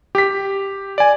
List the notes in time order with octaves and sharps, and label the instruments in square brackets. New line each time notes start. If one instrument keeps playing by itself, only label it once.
[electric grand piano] G4 B6
D5 G#5